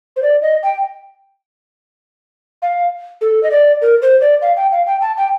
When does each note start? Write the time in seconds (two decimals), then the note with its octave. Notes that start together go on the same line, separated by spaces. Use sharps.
0.16 C5
0.23 D5
0.42 D#5
0.63 G5
2.62 F5
3.21 A4
3.43 D#5
3.51 D5
3.82 A#4
4.02 C5
4.21 D5
4.42 F5
4.57 G5
4.72 F5
4.86 G5
5.01 A5
5.17 G5